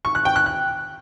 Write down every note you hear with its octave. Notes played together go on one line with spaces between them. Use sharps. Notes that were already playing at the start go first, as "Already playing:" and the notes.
C#6
F#6
G5
F#6
F#6